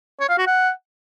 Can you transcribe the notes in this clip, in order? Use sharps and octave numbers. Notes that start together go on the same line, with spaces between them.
C#5
F5
F#4
F#5